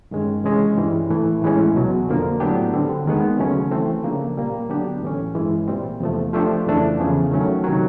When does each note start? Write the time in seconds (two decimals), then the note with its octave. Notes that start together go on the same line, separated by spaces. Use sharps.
0.11 G2 D#3 G#3 C#4
0.44 C3 E3 G#3 C#4
0.77 G2 E3 G3
1.09 A2 E3 A3
1.42 A2 E3 G#3 C#4
1.74 C2 B2 F#3
2.08 F2 D3 F3 A#3
2.40 A2 F#3 B3 D4 G4
2.73 D3 G3 C4
3.06 D#2 D#3 G#3 B3
3.39 C#3 F#3 A3 C#4
3.71 E3 A3 C4
4.04 C#3 F3 A#3 D4
4.37 A#2 G3 A#3
4.70 D3 F#3 B3 D4 G4
5.02 A2 E3 A3 C#4
5.35 G2 E3 G#3
5.68 A#2 G3 C4
6.00 E2 C3 F3 A3
6.33 F3 A3 D4 G4
6.67 F2 C#3 E3 A3 D4
6.99 E2 C#3 F3
7.31 D#3 F#3 A3 C#4
7.64 C3 D#3 F#3